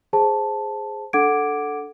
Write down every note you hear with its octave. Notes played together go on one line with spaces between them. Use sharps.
G#4 C5 A5
D4 A4 F#5 D6 G#6 D7